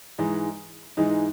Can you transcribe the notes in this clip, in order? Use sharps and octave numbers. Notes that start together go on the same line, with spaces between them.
G#2 E3 G#3 D#4
G#2 E3 G#3 D#4